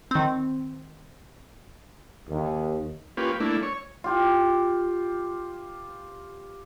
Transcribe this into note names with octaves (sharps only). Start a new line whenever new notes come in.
D#3 C4
D#2
A#3 C#4 F4 G4 B4
A3 A#3 D4 E4
C#5
F4 G4